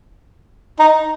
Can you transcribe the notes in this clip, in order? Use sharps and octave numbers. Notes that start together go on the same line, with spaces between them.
D#4